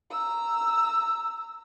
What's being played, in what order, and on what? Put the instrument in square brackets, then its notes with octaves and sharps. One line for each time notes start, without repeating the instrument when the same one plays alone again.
[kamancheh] A#5 E6